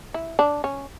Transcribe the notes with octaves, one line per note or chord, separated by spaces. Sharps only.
E4
D4
C#4